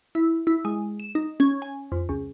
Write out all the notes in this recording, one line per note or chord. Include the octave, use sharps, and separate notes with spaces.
E4
E4
G#3
E7
D#4
C#4
G#5
F2
C#2